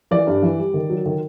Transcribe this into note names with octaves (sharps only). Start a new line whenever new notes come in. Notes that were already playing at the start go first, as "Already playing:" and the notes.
E3 D5
G2
E3
G3
D#3
F#3
D#3